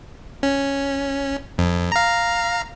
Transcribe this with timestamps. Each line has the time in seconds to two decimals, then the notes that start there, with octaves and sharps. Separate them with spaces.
0.43 C#4
1.58 F2
1.92 F5 A#5